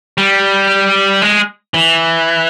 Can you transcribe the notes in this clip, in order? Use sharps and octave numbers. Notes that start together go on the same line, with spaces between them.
G3
G#3
E3